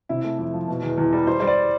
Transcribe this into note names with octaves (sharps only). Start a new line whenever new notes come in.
C3 E4
A3
F2
F3
B2
E2
E2
G3
G3 C5
G3 C5
D5